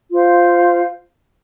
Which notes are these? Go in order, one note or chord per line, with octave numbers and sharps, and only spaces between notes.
F4 C5 F5